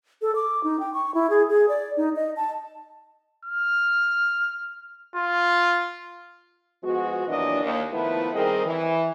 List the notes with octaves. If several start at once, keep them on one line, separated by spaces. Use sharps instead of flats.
A4
D6
D#4
G5
C#6
E4
G#4
G#4
D5
D#4
D#5
A5
F6
F4
F3 G#3 B3 F#4
D#2 A#2 E3 F#3 D4 D#5
D#2
D#3 F3 A3 B3 E4 B4
D#3 G3 C4 G#4 A#4 D#5
E3